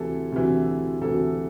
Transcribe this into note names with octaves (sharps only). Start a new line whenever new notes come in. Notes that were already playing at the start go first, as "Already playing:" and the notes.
Already playing: D2 C3 E3 A4
D2 C3 E3
D2 C3 E3 A4